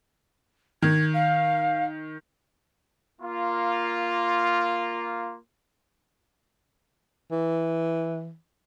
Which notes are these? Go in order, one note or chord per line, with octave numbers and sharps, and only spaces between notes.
D#3 G#6
F5
A#3 F4
E3